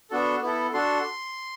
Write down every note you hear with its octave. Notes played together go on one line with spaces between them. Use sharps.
B3 D4 F#4 A4
B3 E4 A4
D4 F#4 A4 C6